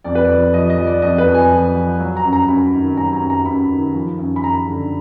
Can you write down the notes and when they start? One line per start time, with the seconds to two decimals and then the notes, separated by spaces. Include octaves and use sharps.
0.04 F2 D5
0.15 B4
0.24 D5
0.29 F2
0.53 F3 D#5
0.70 D#5
0.78 F3
0.87 D5
1.02 F2 D#5
1.18 B4
1.27 F2
1.34 G#5
1.51 F3
1.75 F3
2.00 F#3
2.17 A#5
2.24 F#2
2.33 A#5
2.48 F#2 B5
2.73 D#3
2.97 F#3 A#5
3.13 A#5
3.22 F#2
3.30 A#5
3.46 F#2 B5
3.70 D#3
3.94 F3
4.19 F#2
4.36 B5
4.44 F#2 A#5
4.67 D3